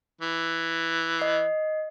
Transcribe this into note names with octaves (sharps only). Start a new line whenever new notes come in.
E3
D#5 C7